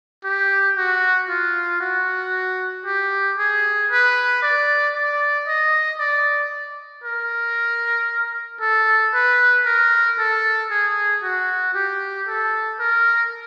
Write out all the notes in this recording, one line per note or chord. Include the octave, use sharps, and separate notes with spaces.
G4
F#4
F4
F#4
G4
G#4
B4
D5
D5
D#5
D5
A#4
A4
B4
A#4
A4
G#4
F#4
G4
A4
A#4